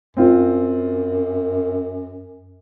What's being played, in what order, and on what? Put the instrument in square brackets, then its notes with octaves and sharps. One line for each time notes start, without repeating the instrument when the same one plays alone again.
[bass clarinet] F#2 [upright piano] C4 F4